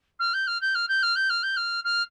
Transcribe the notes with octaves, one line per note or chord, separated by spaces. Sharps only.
F6
G6
F6
G6
F6
G6
F6
G6
F6
G6
F6
F6